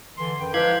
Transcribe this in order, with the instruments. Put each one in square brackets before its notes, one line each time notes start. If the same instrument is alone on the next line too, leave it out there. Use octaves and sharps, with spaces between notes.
[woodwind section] D3 E3 C6
F#2 B4 G5
[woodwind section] F3 G#3 [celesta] E4 B4 [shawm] G4 [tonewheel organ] F5 F#6 G#6